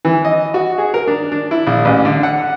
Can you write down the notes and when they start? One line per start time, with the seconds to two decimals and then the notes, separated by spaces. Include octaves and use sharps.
0.05 E3
0.25 D#5
0.54 F#4
0.78 G#4
0.94 A#4
1.07 D4
1.32 D4
1.51 E4
1.67 A#1
1.85 A1
2.05 D3
2.23 F#5